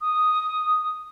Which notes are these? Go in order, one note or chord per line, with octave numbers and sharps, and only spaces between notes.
D#6